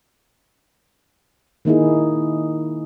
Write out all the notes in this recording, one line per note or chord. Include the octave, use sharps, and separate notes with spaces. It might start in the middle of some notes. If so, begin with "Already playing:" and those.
D#3 A#3 D#4 E4 G#4